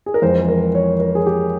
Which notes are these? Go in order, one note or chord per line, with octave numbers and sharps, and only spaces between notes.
G#4
A#4
F2 E3 G#3 C5
A#4
C#5
A#4
G#4
G4